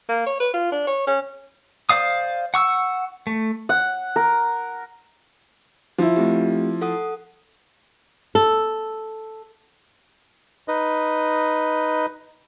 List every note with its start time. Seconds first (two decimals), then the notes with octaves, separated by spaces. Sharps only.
0.09 A#3
0.26 C#5
0.40 B4
0.54 F4
0.71 D4
0.87 C#5
1.07 C#4
1.89 C5 D5 F5 D#6
2.54 F#5 C#6 E6
3.27 A3
3.69 F#5
4.16 A#4
5.98 F3 E4
6.16 A3 C4 G4
6.81 A4 F#5 D#6
8.35 A4
10.68 D#4 B4 D#5